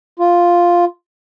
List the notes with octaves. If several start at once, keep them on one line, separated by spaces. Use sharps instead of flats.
F4